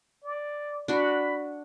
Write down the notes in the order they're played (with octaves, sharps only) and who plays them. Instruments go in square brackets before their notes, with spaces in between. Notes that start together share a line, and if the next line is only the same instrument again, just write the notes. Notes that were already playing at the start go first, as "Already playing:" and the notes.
[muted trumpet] D5
[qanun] D4 F#4 [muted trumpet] B5